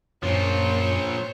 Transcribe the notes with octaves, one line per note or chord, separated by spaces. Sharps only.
F#2 A#2 F3 C5 C#5